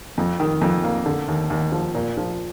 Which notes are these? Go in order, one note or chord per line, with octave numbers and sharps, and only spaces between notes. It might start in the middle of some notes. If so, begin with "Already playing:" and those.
F2
D#3
F2
A#3
D3
D#2
D#2
F3
A#2
F3